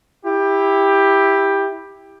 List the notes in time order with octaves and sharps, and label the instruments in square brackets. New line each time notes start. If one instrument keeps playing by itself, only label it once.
[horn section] E4 G4